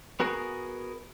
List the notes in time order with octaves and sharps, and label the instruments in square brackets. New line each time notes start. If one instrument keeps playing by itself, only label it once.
[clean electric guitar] B3 F#4 G#4 A#4